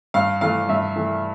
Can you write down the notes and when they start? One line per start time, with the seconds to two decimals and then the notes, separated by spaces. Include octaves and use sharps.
0.14 G2 F5
0.41 E3 A3 F5
0.69 G2 E5
0.96 E3 A3